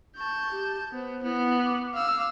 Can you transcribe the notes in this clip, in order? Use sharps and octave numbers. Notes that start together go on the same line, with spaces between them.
A5 C#6 G6
G4
B3 C5
B3 E4
D6
F5 E6